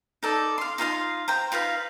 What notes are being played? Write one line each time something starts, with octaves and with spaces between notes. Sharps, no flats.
D#4 A4 D5
F5 C6
D#4 F4 F5 C6
C5 G5 A#5
D#4 F4 B4 F5